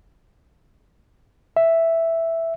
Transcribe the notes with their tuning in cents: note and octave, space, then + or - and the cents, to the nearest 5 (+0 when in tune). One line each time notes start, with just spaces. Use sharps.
E5 +0